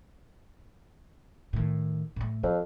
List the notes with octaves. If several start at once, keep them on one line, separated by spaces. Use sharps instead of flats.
A2 D#3
A2 A3
F2 F3